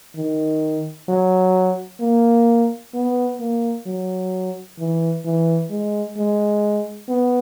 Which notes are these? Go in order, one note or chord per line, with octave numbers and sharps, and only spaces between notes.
D#3
F#3
A#3
B3
A#3
F#3
E3
E3
G#3
G#3
B3